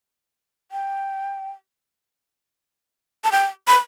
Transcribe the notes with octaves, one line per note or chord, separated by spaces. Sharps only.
G5
A5
G5
B5